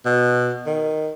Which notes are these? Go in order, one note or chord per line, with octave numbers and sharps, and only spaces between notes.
B2
D#3